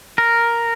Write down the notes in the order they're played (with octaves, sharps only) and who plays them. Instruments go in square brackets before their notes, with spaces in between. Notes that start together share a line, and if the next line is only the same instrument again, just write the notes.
[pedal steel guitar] A#4